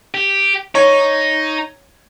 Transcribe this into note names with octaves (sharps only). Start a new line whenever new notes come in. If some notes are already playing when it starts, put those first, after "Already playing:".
G4
D#4 C#5